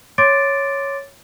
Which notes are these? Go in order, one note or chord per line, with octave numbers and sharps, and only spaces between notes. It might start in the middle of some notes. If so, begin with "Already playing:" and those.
C#5 C6 D6 A6 D7